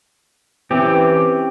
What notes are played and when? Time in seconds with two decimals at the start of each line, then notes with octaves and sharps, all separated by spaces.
0.71 E3 C4 C#4 G4